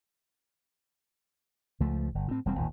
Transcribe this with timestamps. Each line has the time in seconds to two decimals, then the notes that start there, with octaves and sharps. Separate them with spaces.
1.80 C#2 F3 A3
2.15 G1
2.28 A2 C4
2.46 E1 G3 C4
2.58 G#1 D#2 A#2